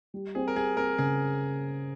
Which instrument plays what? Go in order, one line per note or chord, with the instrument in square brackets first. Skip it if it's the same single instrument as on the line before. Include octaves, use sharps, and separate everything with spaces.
[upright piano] G3
[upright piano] C4 [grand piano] G#4
[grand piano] A#4
[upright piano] G3 [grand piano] G#4
[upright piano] C4 [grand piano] A#4
[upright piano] C#3 [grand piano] G#4